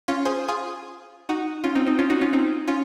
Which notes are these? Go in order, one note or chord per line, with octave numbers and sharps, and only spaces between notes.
C#4 F4
G#4 C5
F4 G#4
D#4 F#4
C#4 F4
C4 D#4
C4 D#4
C#4 F4
D#4 F#4
C#4 F4
C4 D#4
C#4 F4